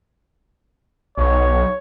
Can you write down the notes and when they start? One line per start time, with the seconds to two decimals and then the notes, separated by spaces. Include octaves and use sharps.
1.17 B1 C#5